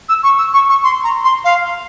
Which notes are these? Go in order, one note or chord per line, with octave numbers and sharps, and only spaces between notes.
E6
C#6
E6
C#6
C#6
C6
A#5
C6
F5